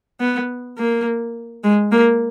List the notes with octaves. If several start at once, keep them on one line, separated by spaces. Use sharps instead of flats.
B3
A#3
G#3
A#3